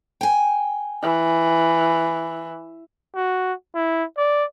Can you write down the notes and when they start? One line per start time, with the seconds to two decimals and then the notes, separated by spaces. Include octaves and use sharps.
0.21 G5 G#5
1.03 E3
3.15 F#4
3.75 E4
4.17 D5